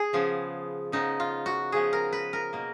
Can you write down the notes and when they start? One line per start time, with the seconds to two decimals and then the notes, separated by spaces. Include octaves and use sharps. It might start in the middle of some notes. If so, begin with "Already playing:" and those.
Already playing: G#4
0.13 C#3 F3 B3
0.92 C#3 F3 B3 D#4
1.20 F4
1.46 F#4
1.72 C#3 F3 B3 G#4
1.93 A#4
2.13 B4
2.33 A#4
2.53 B2 A#3